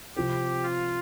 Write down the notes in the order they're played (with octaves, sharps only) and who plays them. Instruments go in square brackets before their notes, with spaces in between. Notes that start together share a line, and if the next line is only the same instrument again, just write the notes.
[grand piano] C3 F3 C4 [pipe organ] G4
[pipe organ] F4